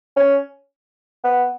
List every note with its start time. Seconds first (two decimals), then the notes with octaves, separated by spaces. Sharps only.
0.16 C#4
1.24 B3